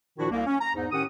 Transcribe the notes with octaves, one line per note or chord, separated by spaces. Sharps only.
A#2 D#3 F3 D4 E4 F#4
C2 A#3
C#4
A#5
E2 G#2 D#4
A2 D#3 C#4 G4 F#5 D#6